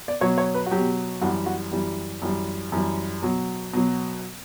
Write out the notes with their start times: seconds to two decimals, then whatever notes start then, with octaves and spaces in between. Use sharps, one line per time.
0.08 D5
0.21 B2 F#3 C#5
0.38 C#5
0.54 B4
0.66 F#4
0.71 B2 F#3 G4
1.22 F#2 E3 G3 F#4
1.46 F#4
1.72 F#2 E3 G3 G4
2.22 F#2 E3 G3
2.72 F#2 E3 G3
3.22 B2 F#3
3.73 B2 F#3